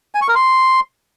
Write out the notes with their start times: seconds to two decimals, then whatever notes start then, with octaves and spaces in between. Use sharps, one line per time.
0.15 G#5
0.22 C#6
0.28 A#4
0.35 C6